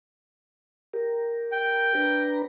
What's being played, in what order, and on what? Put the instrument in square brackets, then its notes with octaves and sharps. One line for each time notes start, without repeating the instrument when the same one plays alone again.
[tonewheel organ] G4 A#4
[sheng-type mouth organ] G5
[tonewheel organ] D4 B4 A#5